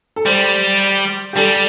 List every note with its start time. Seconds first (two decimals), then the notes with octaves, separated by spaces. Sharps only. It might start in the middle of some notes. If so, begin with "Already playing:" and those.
0.16 A4
0.26 G3 C5
1.33 G4
1.36 G3 A4